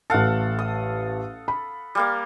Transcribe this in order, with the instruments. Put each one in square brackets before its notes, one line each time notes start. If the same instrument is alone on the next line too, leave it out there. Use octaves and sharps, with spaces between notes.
[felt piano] A1 A5 [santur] A4 F5 F#5
[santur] D#6
[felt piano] B5
[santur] G3 A#3 F5